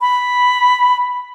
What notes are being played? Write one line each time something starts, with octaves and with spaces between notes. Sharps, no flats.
B5